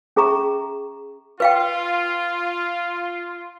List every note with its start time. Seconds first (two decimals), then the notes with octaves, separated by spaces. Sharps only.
0.16 C#4 G#4 E5 A#5 C#6
1.40 F4 B4 F5 G5